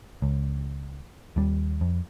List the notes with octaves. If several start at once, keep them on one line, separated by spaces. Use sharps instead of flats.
C#2
D#2 G3
F2